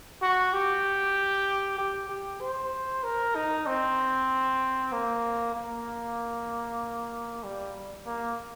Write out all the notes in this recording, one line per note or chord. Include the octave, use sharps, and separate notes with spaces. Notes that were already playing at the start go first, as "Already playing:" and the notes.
F#4
G4
G4
G4
C5
A#4
D#4
C4
A#3
A#3
G3
A#3